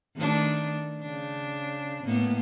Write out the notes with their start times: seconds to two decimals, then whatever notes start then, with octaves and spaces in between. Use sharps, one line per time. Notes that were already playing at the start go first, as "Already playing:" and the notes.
0.16 D#3 A3 D4
1.02 C#3 D4
2.04 A2 A#3 B3